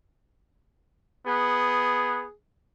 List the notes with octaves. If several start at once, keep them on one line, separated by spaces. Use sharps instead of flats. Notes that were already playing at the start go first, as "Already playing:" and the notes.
B3 G#4